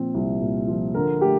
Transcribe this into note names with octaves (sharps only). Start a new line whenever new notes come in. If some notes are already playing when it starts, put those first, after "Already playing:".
Already playing: A#2 F3 C4
C2
A#2
F3
D3 A#4
A3 G4